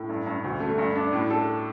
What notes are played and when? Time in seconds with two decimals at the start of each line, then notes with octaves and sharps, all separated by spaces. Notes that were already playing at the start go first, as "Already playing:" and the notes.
Already playing: A2
0.09 G2
0.26 G2
0.44 D2
0.60 A3
0.78 G2
0.95 D4
1.13 A2
1.30 A4